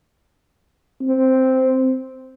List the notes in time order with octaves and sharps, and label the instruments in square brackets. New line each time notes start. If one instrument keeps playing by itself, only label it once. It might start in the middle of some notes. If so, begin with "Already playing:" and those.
[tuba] C4